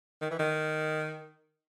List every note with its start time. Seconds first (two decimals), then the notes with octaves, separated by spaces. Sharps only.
0.22 D#3
0.31 E3
0.39 D#3